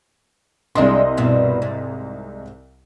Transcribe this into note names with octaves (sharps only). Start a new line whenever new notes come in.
C2 G#3 D4 D#5 C6
G2 B2 E3
G#2